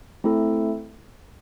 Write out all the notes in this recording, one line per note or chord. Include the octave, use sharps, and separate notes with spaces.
A3 C4 E4 A4